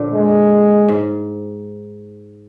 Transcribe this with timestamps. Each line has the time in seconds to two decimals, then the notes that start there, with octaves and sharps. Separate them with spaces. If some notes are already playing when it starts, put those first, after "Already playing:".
Already playing: A#2 D3 F3
0.14 G#3
0.88 G#2